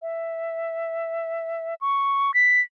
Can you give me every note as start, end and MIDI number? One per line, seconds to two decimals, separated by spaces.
0.02 1.75 76
1.81 2.34 85
2.34 2.61 95